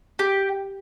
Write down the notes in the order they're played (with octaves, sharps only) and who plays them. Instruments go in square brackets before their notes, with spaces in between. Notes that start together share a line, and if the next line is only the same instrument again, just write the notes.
[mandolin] G4